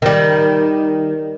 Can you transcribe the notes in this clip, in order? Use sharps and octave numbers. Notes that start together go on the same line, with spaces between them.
D#3 G3